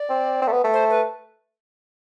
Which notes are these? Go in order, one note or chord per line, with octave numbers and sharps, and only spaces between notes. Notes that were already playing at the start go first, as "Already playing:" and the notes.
Already playing: D5
C4
C4
A3
B3
A3
C5
B4